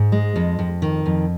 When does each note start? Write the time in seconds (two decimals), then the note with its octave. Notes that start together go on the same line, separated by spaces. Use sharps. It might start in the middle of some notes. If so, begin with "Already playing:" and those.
Already playing: G#2
0.12 G#3
0.36 F2
0.59 F2
0.82 D#3
1.06 F2